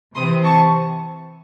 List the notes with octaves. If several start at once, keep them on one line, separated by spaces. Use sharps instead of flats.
C3 E3 C4 C6 D#6
A5 C#6